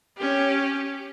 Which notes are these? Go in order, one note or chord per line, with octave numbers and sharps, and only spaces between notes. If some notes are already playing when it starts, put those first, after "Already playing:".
C#4 G4